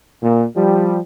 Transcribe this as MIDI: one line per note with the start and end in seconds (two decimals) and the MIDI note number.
0.23 0.46 46
0.57 1.00 53
0.57 1.00 55